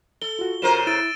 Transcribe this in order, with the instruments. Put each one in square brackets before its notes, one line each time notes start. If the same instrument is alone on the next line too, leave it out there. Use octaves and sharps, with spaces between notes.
[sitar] A4 [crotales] G7
[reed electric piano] F4 F#4
[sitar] C#3 A#4 C5 [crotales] D#7 E7
[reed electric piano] E4 [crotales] E6 A6 D7